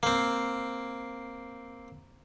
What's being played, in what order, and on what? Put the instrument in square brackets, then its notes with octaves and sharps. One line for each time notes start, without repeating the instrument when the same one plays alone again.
[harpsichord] A#3 C4